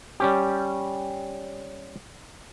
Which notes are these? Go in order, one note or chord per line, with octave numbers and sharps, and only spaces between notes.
G3 C#4 G4